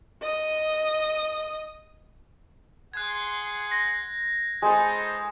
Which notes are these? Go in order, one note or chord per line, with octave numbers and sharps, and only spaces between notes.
D#5 D#6
G#4 F#5 C6 F#6 G#6
A#6
G#3 D#4 A4 B4 C5